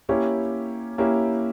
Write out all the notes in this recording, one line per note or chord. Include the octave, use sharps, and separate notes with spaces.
A#3 C#4 E4 G4
A#3 C#4 E4 G4